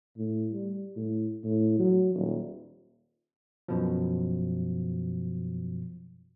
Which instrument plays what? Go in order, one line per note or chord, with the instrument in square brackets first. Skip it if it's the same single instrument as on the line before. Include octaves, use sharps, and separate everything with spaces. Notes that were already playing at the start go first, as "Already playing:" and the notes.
[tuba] A2
G3
A2
A2
F#3
D#1
[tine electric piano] F#2 B2 F3